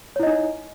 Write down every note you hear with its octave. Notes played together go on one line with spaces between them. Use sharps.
D#4 E4 C#5 D#5